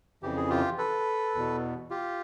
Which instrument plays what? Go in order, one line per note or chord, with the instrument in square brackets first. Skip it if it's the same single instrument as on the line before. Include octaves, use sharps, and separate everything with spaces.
[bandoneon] F2 C#3 E3 G4
G#4
F4 G4
A4 B4
E2 B2
F4 G4